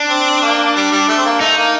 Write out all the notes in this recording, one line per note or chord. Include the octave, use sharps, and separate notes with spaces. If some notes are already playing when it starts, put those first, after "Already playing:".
Already playing: D4
C4
A#3
G3
G3
A3
C4
A#3
A3 D#4
A#3